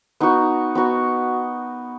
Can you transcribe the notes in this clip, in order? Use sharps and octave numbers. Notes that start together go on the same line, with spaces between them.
B3 D#4 F#4
B3 D#4 F#4